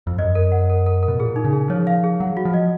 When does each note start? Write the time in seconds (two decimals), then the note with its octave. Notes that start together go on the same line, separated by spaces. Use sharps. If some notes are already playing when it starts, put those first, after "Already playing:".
0.07 F2
0.19 F#2 D#5
0.35 A#4
0.52 F#5
0.70 A#4
0.86 A#4
1.03 A#4
1.08 B2
1.20 A#2 G#4
1.36 D#4
1.44 C#3
1.53 G#4
1.70 F3 C#5
1.87 F5
2.04 G#4
2.20 F#3 F#5
2.37 F#4
2.45 F3
2.54 D#5